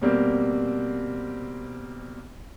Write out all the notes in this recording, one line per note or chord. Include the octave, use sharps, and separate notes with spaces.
B2 G3 A#3 C4